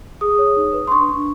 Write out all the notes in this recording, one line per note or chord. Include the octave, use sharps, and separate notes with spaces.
G#4 D#6
C#5
D#4
B4
C6
D4 C#6
D4